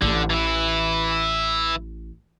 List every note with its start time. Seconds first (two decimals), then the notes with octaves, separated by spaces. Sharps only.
0.02 A1 D3
0.30 E3 E4